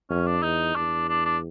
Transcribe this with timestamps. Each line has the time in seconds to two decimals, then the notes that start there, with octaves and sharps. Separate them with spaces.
0.10 F2 C#4
0.26 D4
0.43 E2 D#4
0.75 E2 D4
1.09 D4
1.25 D4